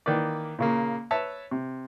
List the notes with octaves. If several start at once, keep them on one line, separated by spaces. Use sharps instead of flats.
D#3 E3 A#3 B4 D5
A#2 C#3 A#3
B4 C#5 E5 A5
C3